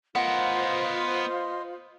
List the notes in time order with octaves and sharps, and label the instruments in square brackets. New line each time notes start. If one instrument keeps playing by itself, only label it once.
[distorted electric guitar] B3 A#4 [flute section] F4 C5 [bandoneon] D#5 C6 [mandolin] F#5